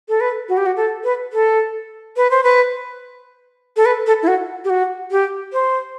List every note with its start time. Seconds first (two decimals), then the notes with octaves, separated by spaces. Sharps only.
0.09 A4
0.21 B4
0.49 F#4
0.57 G4
0.66 F#4
0.77 A4
1.04 B4
1.33 A4
2.17 B4
2.31 C5
2.44 B4
3.77 A4
3.86 B4
4.06 A4
4.23 E4
4.28 F#4
4.64 G4
4.70 F#4
5.11 G4
5.53 C5